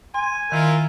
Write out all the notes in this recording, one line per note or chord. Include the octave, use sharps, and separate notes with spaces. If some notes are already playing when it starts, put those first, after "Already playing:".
G#5 C6
D#3 E4 F4 A#4